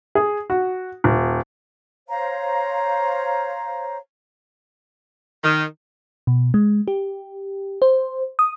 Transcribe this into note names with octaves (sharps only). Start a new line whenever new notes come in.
G#4
F#4
D#1
C5 C#5 F5 A#5
D#3
B2
G#3
G4
C5
D#6